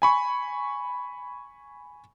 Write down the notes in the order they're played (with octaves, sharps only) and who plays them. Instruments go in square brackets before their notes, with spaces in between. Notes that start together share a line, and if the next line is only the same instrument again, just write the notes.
[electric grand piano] G#5 B5 C#6